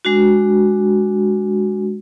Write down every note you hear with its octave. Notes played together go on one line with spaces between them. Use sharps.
G#3 D4 F#4